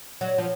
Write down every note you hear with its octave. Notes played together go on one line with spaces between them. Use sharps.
F#3
F3